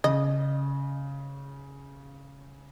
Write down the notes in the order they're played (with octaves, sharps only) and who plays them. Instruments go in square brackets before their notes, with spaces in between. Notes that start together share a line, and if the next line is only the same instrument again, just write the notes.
[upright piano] C#3 [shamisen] D#5